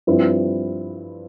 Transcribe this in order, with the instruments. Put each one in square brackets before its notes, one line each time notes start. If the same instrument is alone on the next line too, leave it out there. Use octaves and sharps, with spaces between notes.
[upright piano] G2 F3 C4 E4